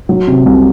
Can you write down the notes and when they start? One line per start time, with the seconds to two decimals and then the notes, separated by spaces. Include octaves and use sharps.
0.09 F#3
0.27 C3
0.46 C2